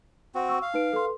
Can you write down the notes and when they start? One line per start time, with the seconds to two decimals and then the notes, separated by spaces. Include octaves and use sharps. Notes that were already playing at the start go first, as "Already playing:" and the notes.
0.35 C4 F#4
0.49 C#6 E6
0.62 F5
0.74 D#4 B4 D7
0.93 A4 B4 C6